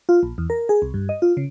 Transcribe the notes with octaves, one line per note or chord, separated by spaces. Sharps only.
F4
A#1
E2
A#4
G#4
C2
G2
D#5
F4
C#3